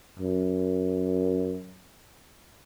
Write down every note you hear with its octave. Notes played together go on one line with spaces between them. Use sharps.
F#2